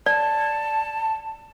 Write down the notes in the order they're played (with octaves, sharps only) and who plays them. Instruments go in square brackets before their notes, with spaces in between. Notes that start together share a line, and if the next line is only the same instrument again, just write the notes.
[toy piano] D5 [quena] A5